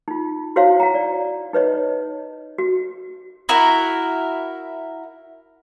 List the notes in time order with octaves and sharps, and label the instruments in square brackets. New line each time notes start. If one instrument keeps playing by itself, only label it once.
[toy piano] D#4 F4
E4 F#4 C5 C#5 F5
F#5 A#5
D5
D#4 B4 C#5 D#5
F#4
[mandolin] E4 F#4 A#4